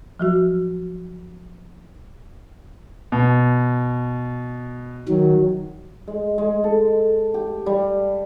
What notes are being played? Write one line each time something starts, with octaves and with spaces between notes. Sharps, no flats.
F3 F#3 F#4
B2
D#3 F#3
G#3
G#3
A4
G4
G3